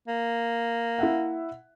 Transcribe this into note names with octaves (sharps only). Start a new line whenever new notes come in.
A#3
E4 E5 F#5